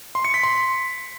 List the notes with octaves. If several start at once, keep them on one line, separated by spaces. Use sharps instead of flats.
C6
C#7
B6
C6